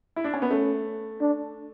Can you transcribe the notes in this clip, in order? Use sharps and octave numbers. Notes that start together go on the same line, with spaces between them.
E4
D4
C#4
B3
A3 C#4
D4